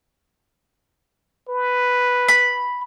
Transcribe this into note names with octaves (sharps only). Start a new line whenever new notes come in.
B4
B5